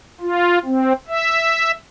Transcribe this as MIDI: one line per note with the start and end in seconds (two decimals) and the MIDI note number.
0.21 0.59 65
0.65 0.93 60
1.08 1.72 76